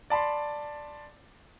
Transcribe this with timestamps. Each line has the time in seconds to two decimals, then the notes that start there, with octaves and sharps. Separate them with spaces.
0.10 D5 A5 B5 C6